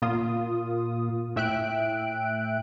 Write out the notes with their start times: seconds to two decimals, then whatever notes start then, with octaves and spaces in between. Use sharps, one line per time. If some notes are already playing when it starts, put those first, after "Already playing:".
0.02 A#2 A#3 F4 D#6
1.36 A2 E5 G5 F#6 D7